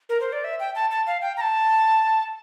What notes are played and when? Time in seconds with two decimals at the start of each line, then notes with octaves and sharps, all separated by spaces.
0.09 A#4
0.20 C5
0.33 D5
0.44 E5
0.60 G5
0.75 A5
0.91 A5
1.07 F5
1.22 G5
1.37 A#5
1.41 A5